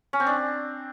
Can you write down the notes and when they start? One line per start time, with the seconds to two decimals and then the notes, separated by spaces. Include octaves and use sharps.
0.13 C#4
0.20 C4
0.27 D4